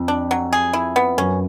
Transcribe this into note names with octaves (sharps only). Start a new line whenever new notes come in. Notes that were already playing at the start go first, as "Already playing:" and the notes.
Already playing: F2
D4
F#3
G#4
E4
B3
F#2 C#4